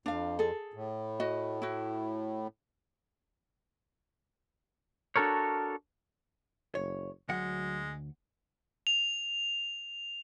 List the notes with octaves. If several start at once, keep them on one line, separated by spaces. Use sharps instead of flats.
F2 D4 F5
G#4 A4
A2
F#4 D#5
E4 F#4
D4 F#4 A4 A#4 C#5
F#1 C#5
D2 F#3 G#3 F#5
F7